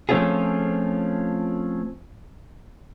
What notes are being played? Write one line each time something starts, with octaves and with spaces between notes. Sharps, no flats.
F3 A3 C4 C#4 F4 G#4